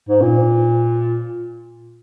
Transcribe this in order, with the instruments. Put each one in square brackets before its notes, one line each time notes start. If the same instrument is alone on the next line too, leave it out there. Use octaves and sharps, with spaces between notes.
[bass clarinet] G#2
A#2